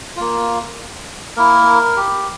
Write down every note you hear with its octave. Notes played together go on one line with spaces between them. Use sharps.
A#3 F4
A#3 E4 A#4
G4